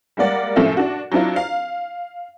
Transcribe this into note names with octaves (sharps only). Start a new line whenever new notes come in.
G3 G#3 A#3 D5 F#5
F#2 A2 C3 F3 A4 E5
D4 F#4
F#3 C4 D4 E4 F4
F5